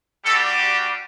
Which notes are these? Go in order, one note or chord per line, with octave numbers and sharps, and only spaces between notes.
G3 D4 F#4 A4
G4